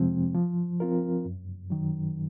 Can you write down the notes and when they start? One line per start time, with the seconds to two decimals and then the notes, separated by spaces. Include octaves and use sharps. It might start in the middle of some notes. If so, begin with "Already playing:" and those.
Already playing: F2 C3 F3 G#3 C4
0.34 F3
0.80 C4 F4 A#4
1.25 F#2
1.70 D#3 F#3